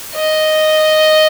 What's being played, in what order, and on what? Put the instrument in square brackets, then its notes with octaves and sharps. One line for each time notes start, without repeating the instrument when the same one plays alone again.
[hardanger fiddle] D#5